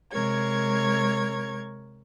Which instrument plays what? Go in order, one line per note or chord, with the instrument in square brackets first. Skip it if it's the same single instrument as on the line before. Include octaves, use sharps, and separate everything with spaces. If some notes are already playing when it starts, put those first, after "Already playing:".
[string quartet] C3 G#3 A#4 C#5 G#6